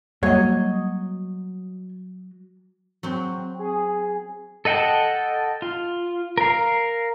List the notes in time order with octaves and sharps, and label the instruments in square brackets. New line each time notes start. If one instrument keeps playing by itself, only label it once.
[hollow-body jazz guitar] F#3 D#5 [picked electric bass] G3 A#3 [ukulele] C#5
[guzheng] F#3 C4
[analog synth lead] G#4
[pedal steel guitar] A4 D#5 F#5 G5 A5
F4
A#4 F5